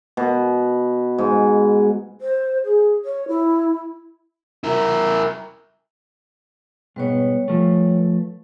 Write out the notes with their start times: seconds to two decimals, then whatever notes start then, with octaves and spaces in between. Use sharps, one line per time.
0.17 B2
1.18 G#2
2.21 C5
2.64 G#4
3.05 C#5
3.28 E4
4.64 E4 A#4
6.96 G#2 B2 G3 B3 B4 C#5
7.48 F3 A3